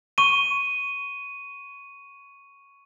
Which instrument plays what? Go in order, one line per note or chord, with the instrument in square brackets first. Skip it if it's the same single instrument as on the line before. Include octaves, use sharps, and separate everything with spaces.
[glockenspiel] C#6 D#7